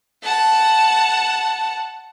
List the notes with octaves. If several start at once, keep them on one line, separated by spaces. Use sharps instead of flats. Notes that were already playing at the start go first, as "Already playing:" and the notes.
F#5 A5